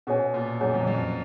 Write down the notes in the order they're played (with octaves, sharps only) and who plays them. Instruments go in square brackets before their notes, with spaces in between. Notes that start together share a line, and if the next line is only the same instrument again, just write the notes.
[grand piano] B2 [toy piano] C#4 G#4 C#5 G#5
[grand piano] A#2
[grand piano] F#2 [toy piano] C#4 G#4 C#5 G#5
[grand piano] F2
F2